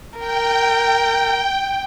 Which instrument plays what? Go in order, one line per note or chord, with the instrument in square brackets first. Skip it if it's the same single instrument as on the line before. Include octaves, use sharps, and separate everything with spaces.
[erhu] A#4 [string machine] G5